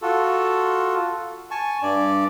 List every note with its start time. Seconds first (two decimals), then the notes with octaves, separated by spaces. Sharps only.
0.02 F4 F#4 A4
1.51 G#5 A5 C#6
1.82 G2 D5